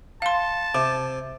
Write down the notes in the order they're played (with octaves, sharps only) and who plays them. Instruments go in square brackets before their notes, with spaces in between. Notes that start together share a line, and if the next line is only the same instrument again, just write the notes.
[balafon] F5 C6 [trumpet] A5
[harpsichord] C3 [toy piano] D6